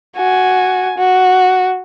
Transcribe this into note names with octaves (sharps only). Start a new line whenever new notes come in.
F#4 G#5
F#4